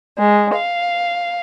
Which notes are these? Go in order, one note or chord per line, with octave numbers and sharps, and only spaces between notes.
G#3
F5